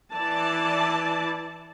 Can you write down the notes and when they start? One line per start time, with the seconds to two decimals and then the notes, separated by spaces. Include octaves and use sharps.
0.12 E3 E4 D5 A5